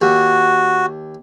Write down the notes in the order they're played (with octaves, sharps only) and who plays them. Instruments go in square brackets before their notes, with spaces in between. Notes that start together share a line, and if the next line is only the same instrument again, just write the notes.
[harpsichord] D#2 [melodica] F#4